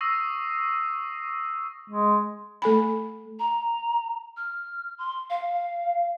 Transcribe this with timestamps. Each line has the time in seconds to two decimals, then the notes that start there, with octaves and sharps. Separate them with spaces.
0.01 C#6 D#6 E6 A#6 C7 D#7
1.90 G#3
2.62 A3 A4 G#5 B5
3.39 A#5
4.37 F6
4.98 C6
5.30 F5